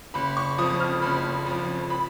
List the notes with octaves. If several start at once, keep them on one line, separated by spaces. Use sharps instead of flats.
F#1 B5
C#6
F2 F3 D#6
F6
F#1 B5
F2 F3
B5